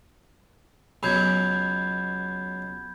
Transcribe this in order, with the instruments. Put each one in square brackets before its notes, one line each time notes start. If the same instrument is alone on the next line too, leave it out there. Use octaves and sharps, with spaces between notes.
[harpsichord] C#2 B2 F#3 [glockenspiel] B5 G6 G#6